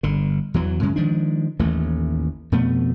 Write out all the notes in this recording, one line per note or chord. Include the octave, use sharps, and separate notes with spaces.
G1 D3
E2 E3 F#3
F#2 C#3 G#3
D#3 F3 G#3 D4
A1 D#2 E3 A3
F2 B2 A3 B3